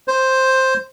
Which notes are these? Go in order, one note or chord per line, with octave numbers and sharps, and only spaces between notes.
C5